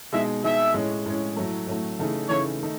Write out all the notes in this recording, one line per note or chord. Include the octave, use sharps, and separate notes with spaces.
B2 G#3 D#4 G#4 E5
B2 G#3 D#4 G#4 E5
A2 G#3 C#4
A2 G#3 C#4
A2 F#3 A3
A2 F#3 A3
C#3 E3 A3 D#4 G#4
C#3 E3 A3 D#4 G#4 C#5
D#3 A3 D#4